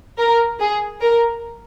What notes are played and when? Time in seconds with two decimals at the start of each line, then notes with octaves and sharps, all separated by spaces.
0.18 A#4
0.60 G#4
1.01 A#4